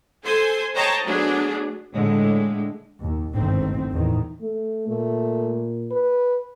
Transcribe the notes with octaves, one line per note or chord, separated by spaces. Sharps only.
A4 C5 G#5 C6
C5 C#5 D#5 G5 A5 A#5
F#3 A3 B3 D4 G#4
A2 D3 G#3
D#2
G1 C2 G#2 D#3 A3 C4
E2 A2 D#3 E3
A3
A#2 A3
B4